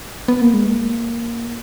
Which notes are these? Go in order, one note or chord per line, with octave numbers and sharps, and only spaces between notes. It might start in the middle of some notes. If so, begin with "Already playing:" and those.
B3
A#3
G#3
A#3